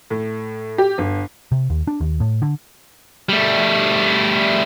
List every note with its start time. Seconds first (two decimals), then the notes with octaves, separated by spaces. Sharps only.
0.10 A2
0.78 G4
0.98 G1
1.52 C3
1.70 D#2
1.87 D4
2.00 D#2
2.20 A2
2.42 D3
3.29 G3 A3